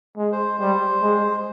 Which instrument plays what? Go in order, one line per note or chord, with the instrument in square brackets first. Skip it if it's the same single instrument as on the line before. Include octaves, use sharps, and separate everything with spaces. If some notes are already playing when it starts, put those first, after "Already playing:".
[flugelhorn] G#3
[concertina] C5
[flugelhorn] G3 [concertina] C5
[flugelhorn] G#3